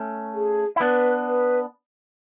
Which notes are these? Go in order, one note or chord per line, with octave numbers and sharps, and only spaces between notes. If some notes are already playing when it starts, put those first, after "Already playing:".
Already playing: A3 C#4
G#4
E4
B3 D4 B4
B4